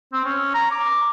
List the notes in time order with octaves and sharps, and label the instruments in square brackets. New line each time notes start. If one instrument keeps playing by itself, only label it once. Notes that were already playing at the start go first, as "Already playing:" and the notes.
[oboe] C4
C#4
A#5
D6